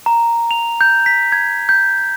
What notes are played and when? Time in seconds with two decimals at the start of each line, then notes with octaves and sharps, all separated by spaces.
0.06 A#5
0.51 F7
0.81 G6
1.06 B6
1.32 G#6
1.69 G6